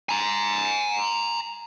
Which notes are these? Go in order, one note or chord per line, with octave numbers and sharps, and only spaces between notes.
G#5 A#5